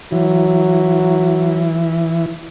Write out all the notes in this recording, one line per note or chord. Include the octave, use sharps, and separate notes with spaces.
E3 F#3